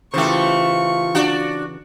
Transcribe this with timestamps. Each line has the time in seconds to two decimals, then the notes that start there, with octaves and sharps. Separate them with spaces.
0.14 C#3 E3 A3 F4 G4 C5 F5 C#6
1.15 D4 F#4